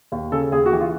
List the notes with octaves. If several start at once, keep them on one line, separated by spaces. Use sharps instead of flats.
D#2
C#3 A4
D#2 G#4
F#4
E3 G4
F4